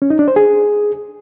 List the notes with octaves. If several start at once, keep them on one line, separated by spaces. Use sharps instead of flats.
C#4
D#4
D4
C5
G#4